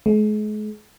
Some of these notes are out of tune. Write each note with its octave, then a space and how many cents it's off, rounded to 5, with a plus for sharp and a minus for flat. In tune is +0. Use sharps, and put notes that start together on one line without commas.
G#3 +40